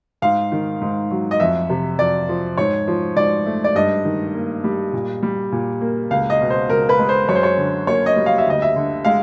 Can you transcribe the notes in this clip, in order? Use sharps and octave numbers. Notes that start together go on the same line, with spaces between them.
G#2 F5
D#3
G#2
F#3
D#5
F2 E5
C3
F2 D5
F3
G#2 C#5
F3
G#2 D5
A3
D5
G2 D#5
D#3
A#3
G3
A#2
G3
A#2
A#3
C#2 F5
D#5
B2
C5
C#2 A#4
B4
G#3
C5
F#2 C#5
C5
C#5
D3
A#3 C#5
D#5
G3
F5
E5
D2 D#5
E5
D3
G#3 F5